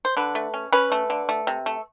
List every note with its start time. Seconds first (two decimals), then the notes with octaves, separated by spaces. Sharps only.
0.05 C5
0.17 D3 B4
0.35 A3
0.54 C#4
0.73 C#4 B4
0.92 A3
1.10 D3
1.29 A3
1.47 C3
1.66 A3